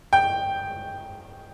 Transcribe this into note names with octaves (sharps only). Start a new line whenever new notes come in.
G5